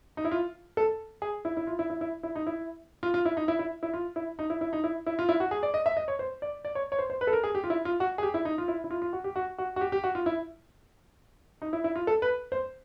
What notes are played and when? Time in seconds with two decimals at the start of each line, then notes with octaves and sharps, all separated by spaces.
0.17 D#4
0.25 E4
0.31 F4
0.77 A4
1.22 G#4
1.45 E4
1.57 E4
1.67 F4
1.79 E4
1.90 E4
2.01 E4
2.23 E4
2.35 D#4
2.47 E4
3.03 F4
3.14 F4
3.25 E4
3.37 D#4
3.48 E4
3.59 E4
3.83 E4
3.94 F4
4.16 E4
4.39 D#4
4.50 E4
4.61 E4
4.73 D#4
4.84 E4
5.06 E4
5.19 F4
5.29 E4
5.40 F#4
5.51 G#4
5.63 D5
5.74 D#5
5.86 E5
5.97 D#5
6.08 C#5
6.19 C5
6.42 D5
6.65 D5
6.75 C#5
6.92 C#5
6.99 C5
7.10 C5
7.21 B4
7.27 A4
7.33 A#4
7.44 G#4
7.55 G4
7.64 F4
7.70 E4
7.85 F4
8.00 F#4
8.18 G#4
8.23 G4
8.34 E4
8.45 D#4
8.58 F4
8.68 E4
8.84 E4
8.91 F4
9.02 F4
9.13 F#4
9.24 G4
9.36 F#4
9.58 F#4
9.76 F#4
9.81 G4
9.92 G4
10.04 F#4
10.15 F4
10.26 E4
11.62 D#4
11.73 E4
11.84 E4
11.96 F4
12.07 A4
12.22 B4
12.52 C5